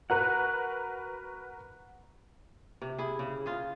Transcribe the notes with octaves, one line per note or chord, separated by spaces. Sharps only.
F#4 A#4 B4 F#5
C3
E4 G#4
C#3
F4 G#4